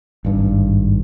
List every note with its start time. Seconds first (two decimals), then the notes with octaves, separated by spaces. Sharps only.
0.25 G#1 G2